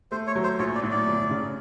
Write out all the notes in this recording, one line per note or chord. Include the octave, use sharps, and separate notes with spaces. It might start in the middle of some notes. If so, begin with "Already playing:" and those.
A3 C5
C#5
F#3
C5
A#1 C#5
D5
A2
D5
G1
C#3